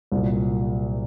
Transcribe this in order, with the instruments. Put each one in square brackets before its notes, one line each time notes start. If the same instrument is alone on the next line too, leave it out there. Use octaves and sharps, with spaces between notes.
[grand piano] C2 A#2 F#3